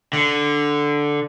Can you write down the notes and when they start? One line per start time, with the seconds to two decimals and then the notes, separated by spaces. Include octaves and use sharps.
0.13 D3